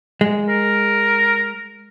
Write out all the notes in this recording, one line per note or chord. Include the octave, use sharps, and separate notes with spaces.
G#3
A#4